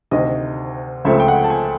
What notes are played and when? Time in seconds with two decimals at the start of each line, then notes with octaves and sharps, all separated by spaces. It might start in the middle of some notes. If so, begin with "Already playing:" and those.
0.11 D2 C3 D#3 D#5
1.05 C#2 C#3 F3 A3 C4 E5
1.20 G5
1.28 F#5
1.44 A5
1.50 G#5